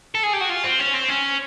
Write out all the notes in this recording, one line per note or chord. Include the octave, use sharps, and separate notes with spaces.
A4
G#4
G4
F#4
F4
C4
C#4
C4
C#4